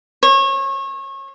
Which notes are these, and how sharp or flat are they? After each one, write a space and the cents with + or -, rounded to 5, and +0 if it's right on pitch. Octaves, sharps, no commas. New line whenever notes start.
C#5 -30